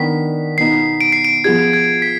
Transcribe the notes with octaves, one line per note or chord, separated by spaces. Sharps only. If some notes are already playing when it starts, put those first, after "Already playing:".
Already playing: D#3 B3 D4 B6
B2 B3 D#4 C7
D7
C7
D7
F3 B3 F4 G#4 G#6
G#6
B6